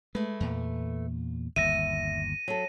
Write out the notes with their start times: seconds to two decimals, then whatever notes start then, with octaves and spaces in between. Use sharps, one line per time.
0.15 G#3 A3 B4
0.40 E2 A#2
1.56 G1 D#2 E5 A#6 D#7
2.48 F#3 A4